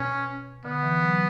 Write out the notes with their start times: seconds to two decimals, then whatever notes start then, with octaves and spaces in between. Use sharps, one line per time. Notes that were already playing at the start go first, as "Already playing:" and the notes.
Already playing: B2 C#4
0.65 D3 B3
0.83 E3
1.02 F#3